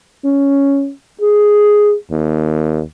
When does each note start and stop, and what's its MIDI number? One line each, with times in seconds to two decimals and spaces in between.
0.25 0.91 61
1.21 1.95 68
2.11 2.81 39